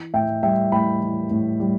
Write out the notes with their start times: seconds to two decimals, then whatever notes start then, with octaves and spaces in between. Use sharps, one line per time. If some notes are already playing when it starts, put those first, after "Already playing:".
Already playing: E3
0.14 A2 E5 G5
0.43 G3 E5 G5
0.72 A2 G5 B5
1.02 E3
1.31 A2
1.60 G3